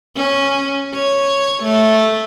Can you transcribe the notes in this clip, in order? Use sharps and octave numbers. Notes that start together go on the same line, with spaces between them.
C#4
C#5
A3